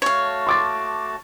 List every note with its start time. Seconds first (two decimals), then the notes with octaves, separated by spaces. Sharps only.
0.02 A3 F#4 C#5 F5 A5
0.47 C6 D6 A6